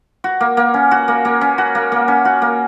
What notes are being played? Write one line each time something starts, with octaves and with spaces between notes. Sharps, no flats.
F#4
A#3
A#3
C#4
F#4
A#3
A#3
C#4
F#4
A#3
A#3
C#4
F#4
A#3